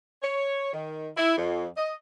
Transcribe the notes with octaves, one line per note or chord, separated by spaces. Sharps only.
C#5
D#3
E4
F2
D#5